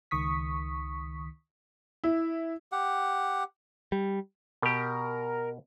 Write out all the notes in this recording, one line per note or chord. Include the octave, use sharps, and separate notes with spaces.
C#2 D#3 C#6 D#6 B6
E4
G4 F#5
G3
B2 G4 A#4